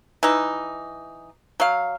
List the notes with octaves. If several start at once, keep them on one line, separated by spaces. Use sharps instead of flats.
E3 D#4
F#3 F5